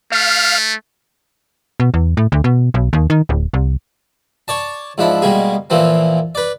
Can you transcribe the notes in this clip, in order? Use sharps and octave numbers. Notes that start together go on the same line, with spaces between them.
A3 F5
B2
E2
A2
D2
B2
B1
D#2
D#3
D1
C2
C#5 D5 A5
G#2 F3 D4 E4
B2 G3 G#3 A#3 G#4
A#2 E3 F3 A#3 C4
B4 D5